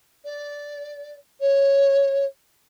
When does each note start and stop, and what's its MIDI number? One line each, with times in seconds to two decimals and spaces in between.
0.25 1.14 74
1.40 2.25 73